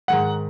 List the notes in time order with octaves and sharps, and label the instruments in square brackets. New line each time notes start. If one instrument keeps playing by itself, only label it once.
[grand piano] G#2 D#3 G#3 F#5